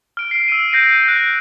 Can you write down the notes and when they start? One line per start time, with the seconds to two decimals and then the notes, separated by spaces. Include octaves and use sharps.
0.17 F6 D7
0.31 C7 D7
0.48 E6 D#7
0.72 G6 A#6 C7 D7 D#7
1.08 F#6 G6 D7